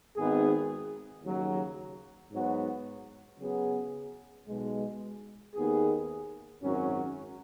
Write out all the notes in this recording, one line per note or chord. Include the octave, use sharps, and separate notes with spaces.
G#1 G#2 D#3 B3 G#4
D#2 C#3 F#3
G#2 F#3 B3 F#4
C#3 F#3 B3 G#4
B1 B2 G#3
D#2 D#3 B3 G#4
G#1 F#2 F#3 C#4